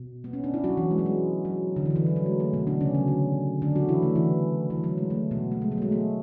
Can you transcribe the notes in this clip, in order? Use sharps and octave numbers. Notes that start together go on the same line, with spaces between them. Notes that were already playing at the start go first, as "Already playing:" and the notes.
Already playing: B2
B3
C#4
D4
E4
F#3 F#4
E3 E4
G#3
F#3
G#3
F#3
D3
E3
D3
E3
F#3
F#3
G#3
A3
B2 B3
D3 D4
C#3 C#4
F#3
D3
D3 D4
F#3 F#4
E3 E4
A3
E3
E3
F#3
G#3
A3
B2 B3
A3
G#3
F#3
A3
G#3
A3